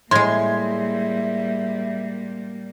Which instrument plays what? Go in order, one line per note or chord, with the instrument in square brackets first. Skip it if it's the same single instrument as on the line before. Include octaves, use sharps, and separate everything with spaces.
[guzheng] A2 G#3 [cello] G3 A#3 [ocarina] E5 [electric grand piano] C6 G#6